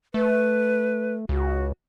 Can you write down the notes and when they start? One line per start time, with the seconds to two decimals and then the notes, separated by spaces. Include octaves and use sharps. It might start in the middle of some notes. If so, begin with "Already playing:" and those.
0.14 A3 B4
1.29 C#2 F#4